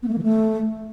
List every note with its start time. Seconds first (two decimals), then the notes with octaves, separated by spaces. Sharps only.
0.03 B3
0.08 A3
0.13 A#3
0.18 E3
0.23 A3